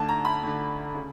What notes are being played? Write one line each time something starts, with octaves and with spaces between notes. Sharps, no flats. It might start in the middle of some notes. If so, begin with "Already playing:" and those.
Already playing: D2 D3 A5
A#5
B5
D2 D3
C#3